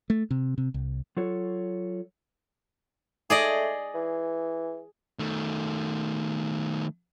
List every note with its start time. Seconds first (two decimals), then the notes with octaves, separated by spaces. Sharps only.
0.10 A3
0.31 C3
0.58 C3
0.74 C2
1.17 F#3 F4 A4 C#5
3.30 A3 G#4 D5 D#5
3.94 E3
5.19 D#3 A3